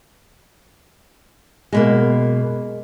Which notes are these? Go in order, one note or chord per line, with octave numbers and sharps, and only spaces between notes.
F#2 B2 G#3 A#3